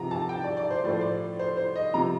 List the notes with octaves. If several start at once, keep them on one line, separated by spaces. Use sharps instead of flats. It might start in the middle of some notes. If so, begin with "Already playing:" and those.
Already playing: C3 F3 A#5
A5
G5
D5
D5
C5
A2 F3 D5
C5
D5
C5
C5
D#5
C3 F3 A#5